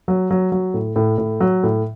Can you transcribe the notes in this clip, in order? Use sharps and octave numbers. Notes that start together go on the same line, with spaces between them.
F#3
F#3
F#3
A2
A2
A2
F#3
A2